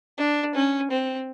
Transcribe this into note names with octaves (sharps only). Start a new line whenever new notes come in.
D4
C#4
C4